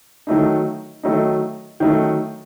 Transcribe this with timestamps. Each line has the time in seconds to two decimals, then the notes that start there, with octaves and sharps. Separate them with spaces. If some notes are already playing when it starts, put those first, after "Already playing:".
0.27 D#3 F#3 A3 D#4
1.03 D#3 F#3 A3 D#4
1.80 D#3 F#3 A3 D#4